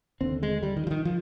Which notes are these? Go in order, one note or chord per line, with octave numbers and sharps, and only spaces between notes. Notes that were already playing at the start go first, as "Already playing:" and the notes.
D#2 D3 C4
G#3
G3
D#3
F3
D#3
F3